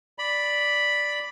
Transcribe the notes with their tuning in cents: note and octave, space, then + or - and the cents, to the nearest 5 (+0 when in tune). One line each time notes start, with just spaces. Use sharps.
D5 +0 B5 +0